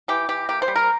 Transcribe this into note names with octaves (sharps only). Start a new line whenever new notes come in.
E3 G4
E3 G4
A#3 G4
C5
G3
A#4